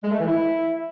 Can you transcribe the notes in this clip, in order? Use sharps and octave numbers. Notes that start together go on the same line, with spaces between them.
G#3
A3
E3
E4